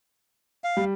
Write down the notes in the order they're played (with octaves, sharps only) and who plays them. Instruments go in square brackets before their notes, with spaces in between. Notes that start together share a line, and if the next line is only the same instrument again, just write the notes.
[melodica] F5
[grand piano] G3